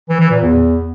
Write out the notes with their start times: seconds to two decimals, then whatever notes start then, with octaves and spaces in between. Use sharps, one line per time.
0.09 E3
0.20 E3
0.31 A#2
0.42 E2